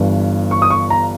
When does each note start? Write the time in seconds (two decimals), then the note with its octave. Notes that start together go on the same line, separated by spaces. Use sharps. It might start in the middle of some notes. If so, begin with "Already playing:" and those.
Already playing: G1 G2 E3
0.51 C#6
0.62 D#6
0.70 C#6
0.90 A#5